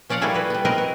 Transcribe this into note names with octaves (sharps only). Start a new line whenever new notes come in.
F3 C#4 D5 F5 F#5
G3 A#3 E4 F#4 G#4 A4
F#4 B4
G3 B3
C4 G#4 A#4 B4 D#5
F#4